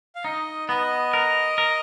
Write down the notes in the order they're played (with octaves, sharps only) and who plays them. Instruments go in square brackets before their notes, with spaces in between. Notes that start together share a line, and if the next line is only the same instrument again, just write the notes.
[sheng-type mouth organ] F5
[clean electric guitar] D#4 [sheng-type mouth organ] D#5
[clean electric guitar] B3 [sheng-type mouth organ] D#5
[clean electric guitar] A#4
A#4